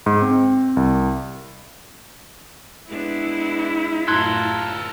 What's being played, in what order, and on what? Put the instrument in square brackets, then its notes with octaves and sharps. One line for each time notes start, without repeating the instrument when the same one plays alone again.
[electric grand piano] G#2
C4
C2
[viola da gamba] G#3 B3 D4 [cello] E4
[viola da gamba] F#2 A2 F4 [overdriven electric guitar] A4 A#4 [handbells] C6 F#6 G#6